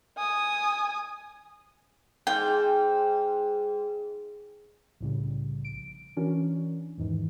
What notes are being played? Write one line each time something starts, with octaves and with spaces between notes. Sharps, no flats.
G#5 D#6
G#2 G5
C2 A2 C#3 G3
A#1 D7
E3 C#4 D4 F#4 A#4
E2 G#2 D#3 E3